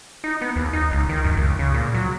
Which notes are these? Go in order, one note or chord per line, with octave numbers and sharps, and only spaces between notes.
D#4
B3
D#2
D#4
C#2
D#3
F#2
C#2
C#3
A#2
F#3